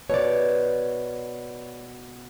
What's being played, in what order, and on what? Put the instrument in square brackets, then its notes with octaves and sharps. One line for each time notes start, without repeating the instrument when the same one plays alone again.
[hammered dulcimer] B2 [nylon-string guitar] C#5 D5